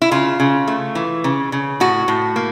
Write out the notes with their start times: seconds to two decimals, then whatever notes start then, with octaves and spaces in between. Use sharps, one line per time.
0.02 E4
0.11 C#3 F4
0.40 C#3
0.67 A3
0.95 E3
1.24 C#3
1.52 C#3
1.80 A2 F#4
2.08 A2
2.36 A#3